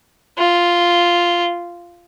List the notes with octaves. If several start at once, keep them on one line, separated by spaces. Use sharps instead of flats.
F4